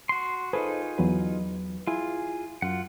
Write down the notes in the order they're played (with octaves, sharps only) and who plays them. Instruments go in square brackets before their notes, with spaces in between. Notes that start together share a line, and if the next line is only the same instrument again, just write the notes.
[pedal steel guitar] F#4 C6
[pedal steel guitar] D#4 F4 G#4 [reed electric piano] A4 B4 C5
[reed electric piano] E2 F#3 B4
[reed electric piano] E4 [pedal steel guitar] F4 G#4
[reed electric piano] F#2 [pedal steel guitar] F4 F#5